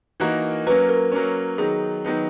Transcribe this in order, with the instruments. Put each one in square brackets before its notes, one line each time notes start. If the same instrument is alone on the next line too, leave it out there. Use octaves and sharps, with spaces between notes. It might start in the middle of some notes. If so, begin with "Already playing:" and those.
[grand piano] E3 A#3 D#4 F#4 A#4
[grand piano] F#3 A#3 C#4 [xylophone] B4
[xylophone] A#4
[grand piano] F#3 A#3 C#4
[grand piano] D#3 F#3 B3 D#4 [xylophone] G#4
[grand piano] D#3 F#3 B3 D#4